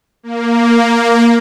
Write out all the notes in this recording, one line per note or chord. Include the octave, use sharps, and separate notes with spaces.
A#3